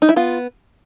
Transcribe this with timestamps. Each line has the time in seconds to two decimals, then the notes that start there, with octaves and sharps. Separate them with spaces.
0.02 D#4
0.09 E4
0.16 B3 F4